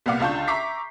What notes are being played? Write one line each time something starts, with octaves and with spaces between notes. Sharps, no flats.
C2 A#2 B3 F5 F#5 D6
C#2 D3 F4 A5 C#6 G6
E5 A#5 C#6 D6 B6 C7